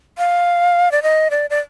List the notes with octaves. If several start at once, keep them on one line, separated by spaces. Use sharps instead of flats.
F5
D5
D#5
D5
D5